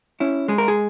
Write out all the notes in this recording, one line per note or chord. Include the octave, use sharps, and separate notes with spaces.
C#4 E4
G#3 G#4
A#4
G#4